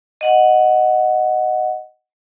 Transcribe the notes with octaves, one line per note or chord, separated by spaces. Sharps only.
D#5 F#5